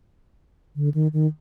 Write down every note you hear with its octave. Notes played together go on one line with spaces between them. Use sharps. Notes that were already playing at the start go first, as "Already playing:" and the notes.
D3
D#3
D#3